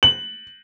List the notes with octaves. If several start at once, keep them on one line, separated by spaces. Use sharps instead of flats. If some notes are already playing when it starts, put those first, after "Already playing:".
F#7